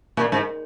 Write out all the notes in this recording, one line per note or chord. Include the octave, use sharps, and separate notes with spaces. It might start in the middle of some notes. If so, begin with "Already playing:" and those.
A#2
G#2